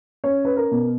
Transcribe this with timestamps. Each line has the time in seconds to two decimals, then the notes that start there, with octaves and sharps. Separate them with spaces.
0.24 C#4 C#5
0.45 B4
0.56 A#4
0.71 B2